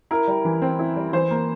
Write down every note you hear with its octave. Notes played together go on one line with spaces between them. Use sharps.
E4 A#4
G3
E3
C4
E4
G3
E3 C5
A#3